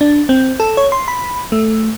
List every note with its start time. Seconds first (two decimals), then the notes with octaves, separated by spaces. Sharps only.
0.01 D4
0.29 C4
0.60 A4
0.77 C#5
0.92 C6
1.08 B5
1.52 A3